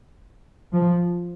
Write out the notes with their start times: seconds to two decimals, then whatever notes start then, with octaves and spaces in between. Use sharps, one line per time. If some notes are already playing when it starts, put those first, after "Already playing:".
0.73 F3